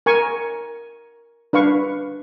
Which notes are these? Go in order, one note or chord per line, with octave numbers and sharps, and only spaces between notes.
A#4 G#5 C#6
D4 B4 F5 C#6